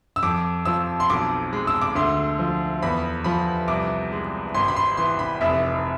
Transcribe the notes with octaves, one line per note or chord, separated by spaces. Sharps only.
E6
F2 D6
F3 E6
C6
B1 D6
G#3
E6
D6
D2 C6
F3
E2 B5
F3 B5
C2 D6
G#3
G#1 C6
B5
C6
E3 C6
B5
F1 E5